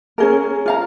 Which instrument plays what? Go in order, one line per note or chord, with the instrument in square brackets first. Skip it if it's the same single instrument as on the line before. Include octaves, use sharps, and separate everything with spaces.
[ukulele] C#4 G#4 A#4
F4 F5 A#5